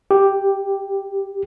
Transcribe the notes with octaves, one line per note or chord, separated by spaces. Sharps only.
G4